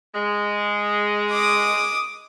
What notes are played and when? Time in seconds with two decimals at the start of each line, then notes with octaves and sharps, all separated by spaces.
0.15 G#3
1.32 D6 D#6